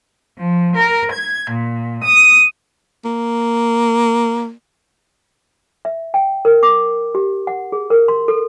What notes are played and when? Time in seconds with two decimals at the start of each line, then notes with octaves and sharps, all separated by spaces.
0.38 F3
0.76 A#4
1.12 G#6
1.50 A#2
2.05 D#6
3.05 A#3
5.85 E5
6.14 G5
6.45 A#4
6.63 D6
7.15 G4
7.47 F#5
7.72 G#4
7.90 A#4
8.08 C6
8.28 A4